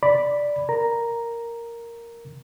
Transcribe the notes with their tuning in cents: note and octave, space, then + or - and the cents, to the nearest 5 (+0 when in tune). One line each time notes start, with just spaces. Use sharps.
D5 +0 B5 +0
A#4 +0 A#5 +0